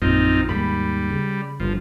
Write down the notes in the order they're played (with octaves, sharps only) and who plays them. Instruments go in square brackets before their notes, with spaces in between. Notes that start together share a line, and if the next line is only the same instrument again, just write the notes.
[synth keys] A#1 [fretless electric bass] F#2 [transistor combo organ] C4 D#4 F4
[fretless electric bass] D#2 G#2 A#3 [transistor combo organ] G3 [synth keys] B5
[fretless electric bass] C#3
[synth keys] G1 [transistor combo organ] F3